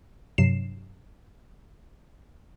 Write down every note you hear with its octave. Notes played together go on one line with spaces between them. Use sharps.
G2 C3 F#3 C7 E7